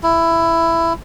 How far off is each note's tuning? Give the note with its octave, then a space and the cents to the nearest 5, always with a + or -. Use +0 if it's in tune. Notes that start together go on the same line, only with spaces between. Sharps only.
E4 +10